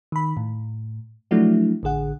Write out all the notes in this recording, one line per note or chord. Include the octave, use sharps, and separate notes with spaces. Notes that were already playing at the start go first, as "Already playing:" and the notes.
D#3 B5
A2
F3 F#3 A3 D4 E4 F#4
A1 D3 G#4 F#5